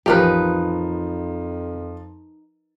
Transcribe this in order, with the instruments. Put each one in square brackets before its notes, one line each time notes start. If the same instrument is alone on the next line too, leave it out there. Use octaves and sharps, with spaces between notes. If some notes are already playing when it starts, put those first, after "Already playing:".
[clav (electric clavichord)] A1 G4 [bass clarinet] F2 [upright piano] F3 [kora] D#4 A#4 B4